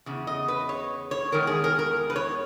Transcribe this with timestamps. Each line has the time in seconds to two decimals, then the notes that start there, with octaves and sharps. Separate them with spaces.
0.06 E2 C#3
0.27 D#5
0.48 B4
0.69 C#5
1.11 C#5
1.32 E2 D#3 G#3 A#4
1.47 G#4
1.64 A#4
1.79 A#4
2.10 B4
2.16 C#5